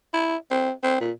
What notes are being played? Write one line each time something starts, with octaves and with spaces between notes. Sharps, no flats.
E4
C4
C4
A#2